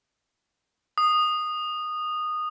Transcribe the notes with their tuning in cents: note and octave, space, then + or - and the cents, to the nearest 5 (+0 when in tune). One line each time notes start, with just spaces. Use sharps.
D#6 -15